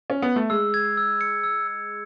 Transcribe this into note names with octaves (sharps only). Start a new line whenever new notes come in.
C#4
B3
A3
G#3 E6
G#6
E6
C#7
E6
E6